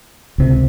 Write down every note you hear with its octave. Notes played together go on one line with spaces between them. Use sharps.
C#2 C3